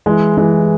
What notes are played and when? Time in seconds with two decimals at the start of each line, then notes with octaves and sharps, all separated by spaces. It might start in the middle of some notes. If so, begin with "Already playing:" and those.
0.06 E3 G#3
0.37 E3 G#3